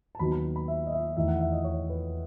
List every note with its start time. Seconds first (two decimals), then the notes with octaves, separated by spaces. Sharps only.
0.15 A5
0.19 D#2 D#3 F#3 B3 D#4 B5
0.32 B5
0.56 B5
0.68 E5
0.87 D#5
0.92 E5
1.17 E2 D#3 A3 E4 E5
1.28 F#5
1.40 E5
1.52 D#5
1.64 C#5
1.90 B4